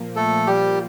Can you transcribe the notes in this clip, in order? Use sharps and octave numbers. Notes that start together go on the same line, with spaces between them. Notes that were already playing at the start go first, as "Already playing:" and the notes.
Already playing: A#2 F3 A#3
A3 A4
G3 G4